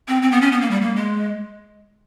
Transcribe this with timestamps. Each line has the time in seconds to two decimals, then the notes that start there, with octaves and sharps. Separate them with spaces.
0.08 C4
0.22 C4
0.32 B3
0.42 C#4
0.52 B3
0.61 A#3
0.71 G3
0.82 A#3
0.96 G#3